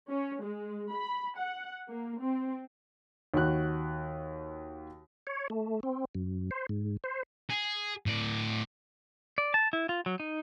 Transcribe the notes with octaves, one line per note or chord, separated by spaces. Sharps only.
C#4
G#3
B5
F#5
A#3
C4
D#2 F#4 F#6
C#5
A3
C4
F#2
C5
G#2
C5
G#4
A2 D5
D5
A5
E4
F4
F#3
D#4